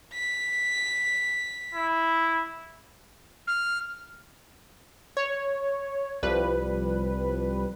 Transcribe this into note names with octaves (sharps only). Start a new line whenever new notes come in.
B6
E4
F6
C#5
C2 F3 G3 B4